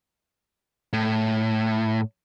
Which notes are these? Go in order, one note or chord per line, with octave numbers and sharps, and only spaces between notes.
A2